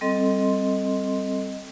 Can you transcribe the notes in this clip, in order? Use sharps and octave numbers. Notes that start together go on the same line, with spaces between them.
G3 C4 A4 D#5 C6